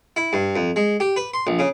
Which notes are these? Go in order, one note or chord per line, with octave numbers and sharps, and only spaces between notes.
E4
G2
F2
G#3
G4
B4
C6
A#1
C#3